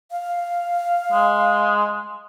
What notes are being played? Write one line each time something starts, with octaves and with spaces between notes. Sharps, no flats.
F5
G#3